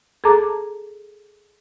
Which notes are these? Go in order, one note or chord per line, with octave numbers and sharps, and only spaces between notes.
G#4 A4 A5 A#5 D6